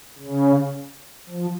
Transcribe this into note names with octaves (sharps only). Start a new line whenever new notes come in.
C#3
F3